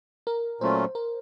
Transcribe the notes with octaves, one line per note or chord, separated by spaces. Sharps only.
A#4
A#2 F#3 A3 C#4 F4 C5
A#4